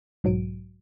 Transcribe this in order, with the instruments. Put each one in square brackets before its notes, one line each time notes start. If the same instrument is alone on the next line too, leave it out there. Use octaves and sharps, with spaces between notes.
[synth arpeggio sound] B1 G#2 F#3 D7 D#7